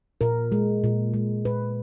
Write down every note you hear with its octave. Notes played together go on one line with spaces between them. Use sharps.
A#2 A#4
G#3
A#2
G#3
A#2 B4